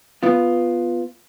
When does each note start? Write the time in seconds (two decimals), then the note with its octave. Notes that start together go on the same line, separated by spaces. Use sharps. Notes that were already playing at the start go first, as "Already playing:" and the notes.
0.23 B3 F4